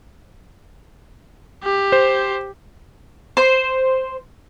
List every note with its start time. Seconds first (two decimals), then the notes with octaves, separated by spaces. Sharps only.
1.64 G4
1.92 C5
3.37 C5